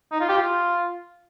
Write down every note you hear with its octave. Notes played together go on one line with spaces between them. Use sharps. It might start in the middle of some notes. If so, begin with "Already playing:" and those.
D#4
F4
G4
F4